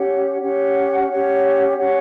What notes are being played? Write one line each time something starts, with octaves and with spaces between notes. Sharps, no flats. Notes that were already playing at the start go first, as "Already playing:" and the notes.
Already playing: C#4 G4 C#5 F#5
C#4 G4 C#5 F#5
C#4 G4 C#5 F#5
C#4 G4 C#5 F#5